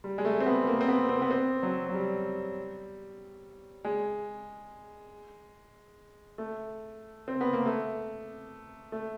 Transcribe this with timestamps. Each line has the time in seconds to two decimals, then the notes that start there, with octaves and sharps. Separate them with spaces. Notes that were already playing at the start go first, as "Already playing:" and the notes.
0.04 G3
0.18 G#3
0.25 A3
0.40 C4
0.46 B3
0.67 A#3
0.81 C4
0.88 B3
1.09 C4
1.22 B3
1.31 C4
1.63 F#3
1.88 F#3
1.94 G3
3.85 G#3
6.38 A3
7.28 C4
7.41 B3
7.53 A#3
7.66 A3
8.92 A3